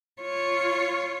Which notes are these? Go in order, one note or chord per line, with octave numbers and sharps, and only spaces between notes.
F4 C#5